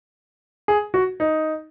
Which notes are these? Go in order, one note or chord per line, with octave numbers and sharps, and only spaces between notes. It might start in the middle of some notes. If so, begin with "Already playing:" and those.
G#4
F#4
D#4